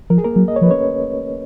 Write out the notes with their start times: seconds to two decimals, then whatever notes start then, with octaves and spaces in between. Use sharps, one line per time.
0.10 F3 A#4
0.18 G#4
0.24 A#3 A#4
0.36 F#3
0.48 D#5
0.56 C#5
0.61 F3 B4
0.71 C#4 C#5